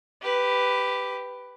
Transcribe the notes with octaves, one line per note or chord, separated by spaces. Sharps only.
G4 B4